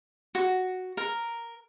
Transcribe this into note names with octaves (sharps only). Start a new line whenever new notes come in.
F#4
A#4